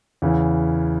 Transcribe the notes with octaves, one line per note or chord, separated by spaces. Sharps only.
E2 C#3 E3